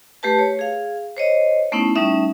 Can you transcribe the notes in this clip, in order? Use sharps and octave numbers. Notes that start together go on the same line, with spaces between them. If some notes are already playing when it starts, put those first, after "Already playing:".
A3 G4 B4 A5
C#5
G#4 F5
C5 C#5 D#5
A3 B3 C#4 D#4 E4
G3 A3 C#4 D#4 E5